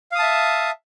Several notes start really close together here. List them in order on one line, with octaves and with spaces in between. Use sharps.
F5 D#6 A5 E5